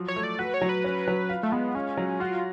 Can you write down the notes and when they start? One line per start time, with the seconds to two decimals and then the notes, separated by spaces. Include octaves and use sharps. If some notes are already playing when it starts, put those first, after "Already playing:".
Already playing: F3 F#3
0.08 C#5
0.16 A3
0.23 D5
0.38 F#4 B4
0.54 C#5
0.61 F#3
0.69 B4
0.84 C#4
1.08 F#3
1.29 F4
1.43 A3
1.52 G#3 B3
1.75 C#4 F4
1.97 F#3
2.20 F4 F#4